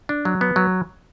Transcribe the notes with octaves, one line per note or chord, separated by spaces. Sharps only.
D4
F#3
B3
F#3